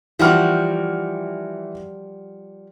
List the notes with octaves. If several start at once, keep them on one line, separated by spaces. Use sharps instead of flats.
E3 F3 G3 F#4 F6